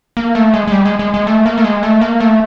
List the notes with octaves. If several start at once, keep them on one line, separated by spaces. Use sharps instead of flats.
A#3
A3
G#3
G#3
G3
G#3
G#3
G#3
A3
A#3
A3
G#3
A3
A#3
A3